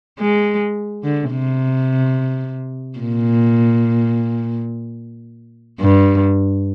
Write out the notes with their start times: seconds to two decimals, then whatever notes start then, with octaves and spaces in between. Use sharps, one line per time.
0.19 G#3
1.04 D3
1.31 C3
2.99 A#2
5.80 G2